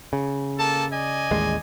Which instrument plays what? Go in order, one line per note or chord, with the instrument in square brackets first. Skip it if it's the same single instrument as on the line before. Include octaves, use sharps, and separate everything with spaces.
[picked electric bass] C#3
[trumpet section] A#3 A4 A5
D5 D#5 G#5
[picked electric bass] A1 D#2 G#3